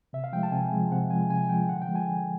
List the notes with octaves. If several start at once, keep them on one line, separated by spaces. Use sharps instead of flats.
C3 E5
F5
F3 G#3 G5
A5
C3 G#5
F3 G#3
C3 F#5
F3 G#3 G#5
C3 G#5
F3 G#3 G5
D3 F#5
G5
F3 G#3
G#5
D3